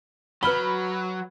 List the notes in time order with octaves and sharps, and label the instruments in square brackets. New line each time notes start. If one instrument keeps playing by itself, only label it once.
[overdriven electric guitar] F#3 [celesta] B4 F6 G7 [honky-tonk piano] B5